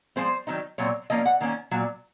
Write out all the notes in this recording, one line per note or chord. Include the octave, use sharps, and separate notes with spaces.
F3 G#3 C4 C5
D#3 F#3 C4 D#4
A#2 F#3 C4 C#5
F3 A#3 C#4 D#5
F#5
D#3 A#3 C#4
A#2 F#3